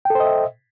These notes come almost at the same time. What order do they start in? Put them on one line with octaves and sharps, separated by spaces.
G5 A4 C5 D#5 E5